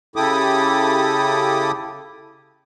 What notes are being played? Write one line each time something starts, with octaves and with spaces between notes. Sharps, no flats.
C#3 E4 G4 A4 D6 D#6